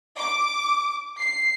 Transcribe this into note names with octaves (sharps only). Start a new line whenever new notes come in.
D6
C7